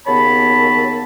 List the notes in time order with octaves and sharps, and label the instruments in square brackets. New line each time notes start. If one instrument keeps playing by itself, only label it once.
[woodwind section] D#2 C#3 B3 C#5 A5 B5